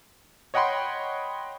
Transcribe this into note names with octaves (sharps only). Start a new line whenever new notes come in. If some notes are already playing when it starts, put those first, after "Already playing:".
C#5 D#5 F#5 G5 B5 C6